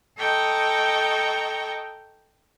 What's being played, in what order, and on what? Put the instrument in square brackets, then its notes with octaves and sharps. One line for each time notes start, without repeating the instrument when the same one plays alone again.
[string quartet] A4 D#5 G5 A#5 C#6